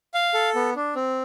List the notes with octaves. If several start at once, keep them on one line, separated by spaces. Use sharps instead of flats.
F5
A4
B3
D4
C4